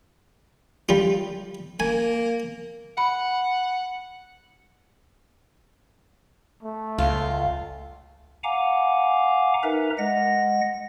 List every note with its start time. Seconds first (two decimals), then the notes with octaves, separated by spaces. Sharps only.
0.89 G3 F4
1.80 A#3 G#5
2.98 F#5 B5
6.63 A3
6.98 C#2 F4
8.44 F5 F#5 G#5 A#5 D6
9.63 D#4 A#4 B4 E5 A#5
9.98 G#3 D#5 F#5 A#6